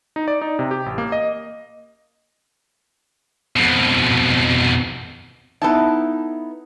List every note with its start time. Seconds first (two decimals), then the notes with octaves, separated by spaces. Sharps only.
0.16 D#4
0.28 D5
0.42 D#4
0.59 C3
0.71 G4
0.86 A1
0.98 A#3
1.12 D#5
3.56 F2 B2
5.62 B3 D#4 E4 A4 A5